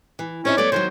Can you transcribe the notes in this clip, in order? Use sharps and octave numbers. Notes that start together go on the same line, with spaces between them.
E3
C4 C#4 D#4 E4 C#5
F#3 A3 B3 D5
D3 D#3 F#3 C5